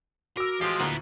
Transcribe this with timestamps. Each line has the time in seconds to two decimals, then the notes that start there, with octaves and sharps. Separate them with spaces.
0.37 F#4 A#4 D6 E6
0.61 A1 F3 G#3 G4 C7
0.80 D2 A#2 E4 F#5 A#5